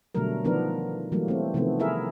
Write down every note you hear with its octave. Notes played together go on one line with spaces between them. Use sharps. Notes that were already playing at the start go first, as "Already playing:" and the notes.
B2 D3 F#3 G3 A3 A#4
D#3 F3 B3 D4 A#4
E3 F#3 G3 A3 A#3
A3 C4
C3 D#3 F3 A3 B3
E4 G#4 A#4 E5